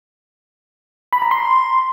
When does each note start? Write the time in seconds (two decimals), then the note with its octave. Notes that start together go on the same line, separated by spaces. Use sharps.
1.13 B5
1.22 A#5
1.31 C6